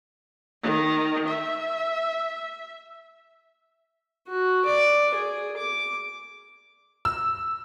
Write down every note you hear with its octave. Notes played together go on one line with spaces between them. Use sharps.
D#3
E5
F#4
D5
G#4
D6
E6